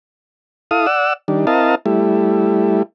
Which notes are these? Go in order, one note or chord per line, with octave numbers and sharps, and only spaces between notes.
E4 A4 F5 D#6
D5 F#5 E6
D#3 G3 D4
C4 E4 A#4 D#5 F5 A5
G3 A3 E4